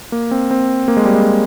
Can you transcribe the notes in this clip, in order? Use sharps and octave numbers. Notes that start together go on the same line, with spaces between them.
A#3
C4
C4
A#3
G#3
G3
G#3